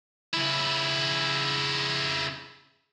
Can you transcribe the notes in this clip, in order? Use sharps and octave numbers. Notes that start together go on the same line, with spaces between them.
C#3 E4